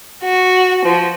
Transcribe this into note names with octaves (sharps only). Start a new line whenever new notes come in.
F#4
F3